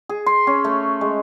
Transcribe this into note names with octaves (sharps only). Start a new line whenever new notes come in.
G#4
C6
C#4
A3
G#3